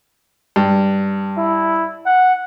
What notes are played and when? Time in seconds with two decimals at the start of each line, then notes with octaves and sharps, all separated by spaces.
0.56 G2
1.38 E4
2.06 F#5